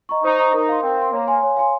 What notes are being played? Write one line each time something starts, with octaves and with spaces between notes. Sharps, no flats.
D#5 A#5 C#6
D#4 C5
D#5 A#5 C#6
D#4 A#4
F5 C6
C4 A#4
F5 C6
A#3 C#5
F5 G#5 C6
C#5
F5 G#5 C6